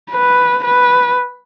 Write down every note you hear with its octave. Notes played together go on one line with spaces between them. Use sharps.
B4
B4